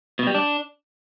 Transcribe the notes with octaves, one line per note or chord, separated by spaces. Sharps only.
B2
G3
D4